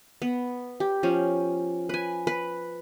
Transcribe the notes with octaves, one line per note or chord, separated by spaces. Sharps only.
B3
G4
F3 C#4
B4 G#5
B4